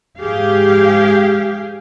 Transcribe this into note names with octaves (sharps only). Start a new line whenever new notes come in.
G#2 G4 G#4 F5